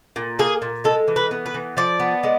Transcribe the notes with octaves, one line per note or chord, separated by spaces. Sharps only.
A#2
A#3 G#4
A#2
G#3 A4
E3
B4
B3
B4
E3
F3 D5
B3
G#3